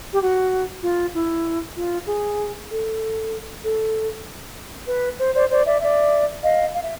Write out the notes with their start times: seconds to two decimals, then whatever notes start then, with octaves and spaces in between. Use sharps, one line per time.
0.14 G4
0.22 F#4
0.84 F4
1.15 E4
1.76 F4
2.07 G#4
2.70 A4
3.64 A4
4.88 B4
5.19 C5
5.34 C5 D5
5.50 C5 D5
5.65 D5 E5
5.81 D5 E5
6.43 D#5 F5
6.74 F5
6.84 E5